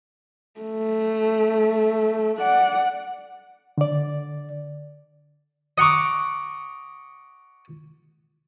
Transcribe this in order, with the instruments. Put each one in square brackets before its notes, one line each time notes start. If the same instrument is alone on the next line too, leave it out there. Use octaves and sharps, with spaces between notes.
[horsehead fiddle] A3
D5 F#5
[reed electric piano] D3 D5
[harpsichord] D#5 F#5 A#5 C#6 D6